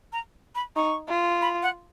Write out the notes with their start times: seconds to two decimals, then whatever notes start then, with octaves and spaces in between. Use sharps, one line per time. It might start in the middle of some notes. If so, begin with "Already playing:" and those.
0.13 A#5
0.55 B5
0.76 D#4 C#6
1.09 F4
1.42 B5
1.63 F#5